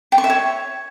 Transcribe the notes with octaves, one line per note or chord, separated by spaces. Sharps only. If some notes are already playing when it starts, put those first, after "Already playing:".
G5
C#6
E5
C#5